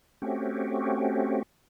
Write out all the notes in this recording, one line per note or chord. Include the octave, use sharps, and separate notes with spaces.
A3 C4 C#4 F#4 G4